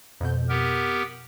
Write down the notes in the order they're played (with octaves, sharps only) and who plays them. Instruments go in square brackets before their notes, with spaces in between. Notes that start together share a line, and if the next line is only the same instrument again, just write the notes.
[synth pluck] F2 B2 G6
[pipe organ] B3 G4 A#4